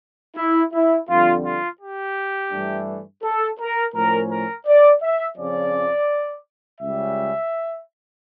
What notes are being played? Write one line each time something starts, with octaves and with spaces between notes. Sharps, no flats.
E4
E4
F2 D3 G3 F4
F4
G4
G2 E3 A3 D4
A4
A#4
A2 F3 C#4 A#4
A#4
D5
E5
F2 C#3 F3 C#4 D5
C#2 C#3 G3 E5